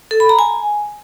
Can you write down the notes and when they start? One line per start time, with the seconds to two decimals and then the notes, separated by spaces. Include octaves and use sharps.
0.11 A4
0.20 B5
0.29 A#5
0.39 G#5